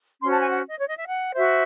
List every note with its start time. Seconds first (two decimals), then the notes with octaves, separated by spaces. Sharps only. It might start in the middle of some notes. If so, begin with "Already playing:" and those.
0.21 C#4 F#4 C5 C6
0.31 A5
0.40 G#5
0.50 F#5
0.68 D#5
0.78 C#5
0.88 D#5
0.97 E5
1.06 F#5
1.34 F#4 C5 E5